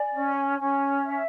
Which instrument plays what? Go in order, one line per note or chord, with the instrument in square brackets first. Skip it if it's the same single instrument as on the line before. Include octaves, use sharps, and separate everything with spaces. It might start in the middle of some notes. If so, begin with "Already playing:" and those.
Already playing: [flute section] D5 [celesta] G#5
[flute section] C#4
C#4
E5